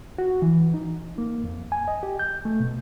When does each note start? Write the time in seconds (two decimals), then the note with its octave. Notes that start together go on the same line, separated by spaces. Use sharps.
0.18 F#4
0.42 E3
0.74 D#4
1.18 A#3
1.44 F2
1.72 G#5
1.88 D#5
2.03 G4
2.19 G6
2.45 A3
2.60 B2